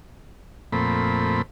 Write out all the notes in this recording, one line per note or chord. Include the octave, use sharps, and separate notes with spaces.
F2 A#2 A3 C4 B5